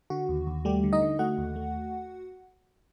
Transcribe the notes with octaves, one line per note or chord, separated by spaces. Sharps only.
D3 F#4
D#2
D#2
G3 A3 G4
D3
D#4 D#5
D3
A3 F#4 F#5
D#2
A3